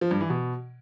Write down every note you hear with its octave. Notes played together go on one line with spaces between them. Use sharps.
F3
G2
E3
B2